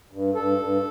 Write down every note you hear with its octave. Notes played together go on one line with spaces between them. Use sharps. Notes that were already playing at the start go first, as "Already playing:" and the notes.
G2
G2 A4
G2